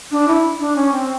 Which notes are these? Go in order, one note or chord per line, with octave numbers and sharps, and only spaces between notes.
D4
E4
D4
C#4
C4